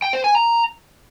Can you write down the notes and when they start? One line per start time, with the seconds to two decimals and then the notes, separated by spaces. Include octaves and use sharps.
0.02 G5
0.13 C5
0.24 G#5
0.35 A#5